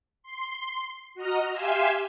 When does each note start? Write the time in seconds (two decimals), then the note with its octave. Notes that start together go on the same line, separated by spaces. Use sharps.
0.23 C6
1.15 F#4 D#5 A#5 F6
1.51 G4 E5 F5 G#5 C6 E6